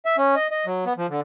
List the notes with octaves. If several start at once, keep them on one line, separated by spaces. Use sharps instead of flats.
E5
C#4
D#5
D#5
F#3
B3
F3
D3